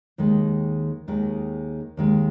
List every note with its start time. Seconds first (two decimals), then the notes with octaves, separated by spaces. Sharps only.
0.18 D#2 D#3 G#3
1.08 D#2 D#3 G#3
1.97 D#2 D#3 G#3